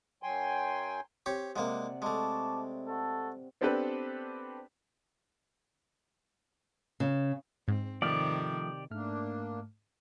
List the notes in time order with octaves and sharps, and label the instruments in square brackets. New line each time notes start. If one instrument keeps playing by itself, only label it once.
[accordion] F#2 F#3 G5 G#5 C6
[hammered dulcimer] C4 [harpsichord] G4 C#5
[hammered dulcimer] C3 D5 F#5 [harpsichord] G#3 A#3
[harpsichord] G#3 A3 [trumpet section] A5 C#6 D6
[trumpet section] F#4 A4
[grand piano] B3 C4 D4 G4 A4 B4
[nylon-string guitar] C#3
[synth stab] G#2 [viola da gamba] C4
[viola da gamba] C3 D#3 [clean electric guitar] F3 A3 [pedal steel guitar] G4 D5
[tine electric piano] G#2 A3 F6 [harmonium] A#3 D4